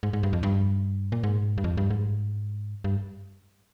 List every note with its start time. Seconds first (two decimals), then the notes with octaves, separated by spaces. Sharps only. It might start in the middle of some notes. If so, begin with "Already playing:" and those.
0.03 G#2
0.13 G#2
0.23 G2
0.33 F2
0.43 G2
1.12 A#2
1.23 G#2
1.58 G2
1.64 F2
1.77 G2
1.90 G#2
2.84 G2